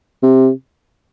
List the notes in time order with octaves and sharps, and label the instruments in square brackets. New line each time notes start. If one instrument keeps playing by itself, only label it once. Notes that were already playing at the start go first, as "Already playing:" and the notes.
[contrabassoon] C3